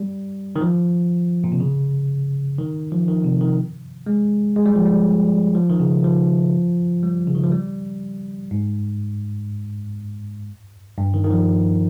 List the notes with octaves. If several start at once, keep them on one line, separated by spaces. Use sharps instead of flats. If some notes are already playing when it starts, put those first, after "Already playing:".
Already playing: G3
D#3
F3
A#2
C3
C#3
D#3
F3
D#3
C3
D#3
G#3
G#3
G3
F3
G3
F3
D#3
C#3
F3
G3
C#3
D#3
F3
G3
G#2
G2
D#3
D#3
F3